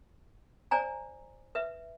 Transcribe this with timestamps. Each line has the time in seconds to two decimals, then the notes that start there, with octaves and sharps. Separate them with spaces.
0.71 C5 D5 G#5 A#5
1.55 B4 E5